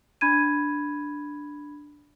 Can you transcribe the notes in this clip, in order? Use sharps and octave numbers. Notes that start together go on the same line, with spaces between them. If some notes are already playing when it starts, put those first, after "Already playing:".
D4 B5 G#6 D#7